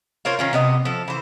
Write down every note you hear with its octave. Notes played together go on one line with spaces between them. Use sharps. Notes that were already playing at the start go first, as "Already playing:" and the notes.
F4 A#4 C5 C#5
D#3 C#4 F4
C3 B3 D#5
F3 A4
E3 C5